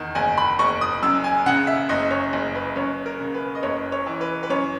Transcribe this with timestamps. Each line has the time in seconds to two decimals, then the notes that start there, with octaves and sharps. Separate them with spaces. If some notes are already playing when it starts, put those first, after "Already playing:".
Already playing: E2 D#3
0.15 F#1 G#5
0.38 B5
0.59 F#1 C#6
0.81 D#6
1.03 F#2 E6
1.24 G#5
1.46 C#3 F#5
1.67 E5
1.89 F#1 D#5
2.11 C#5
2.33 F#1
2.55 B4
2.76 F#2 C#5
3.06 A#4
3.20 C#3
3.34 B4
3.55 D#5
3.63 F#1 C#5
3.92 C#5
4.06 E3
4.21 B4
4.43 B4
4.50 F#2 C#5